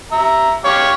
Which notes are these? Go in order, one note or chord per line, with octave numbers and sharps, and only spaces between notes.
E5 A#5
G4 C#5 F5